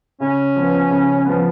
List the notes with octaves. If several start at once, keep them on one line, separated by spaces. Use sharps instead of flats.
C#3 C#4
F3 B3
C#3
F3 B3